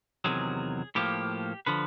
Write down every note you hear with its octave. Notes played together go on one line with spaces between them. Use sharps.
E2 C3 D#3 F#3 G#4
A2 F3 A#3 G4
D3 F3 B4